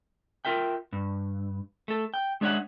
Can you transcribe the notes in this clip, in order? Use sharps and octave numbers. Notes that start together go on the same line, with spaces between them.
F4 A#4 E5 G5
G2
A3 A4
G5
G#3 D4 C#5 E5 F#5